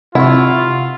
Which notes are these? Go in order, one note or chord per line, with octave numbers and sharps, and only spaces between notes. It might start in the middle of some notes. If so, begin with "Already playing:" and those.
C3 E4 F4 F#5 C#6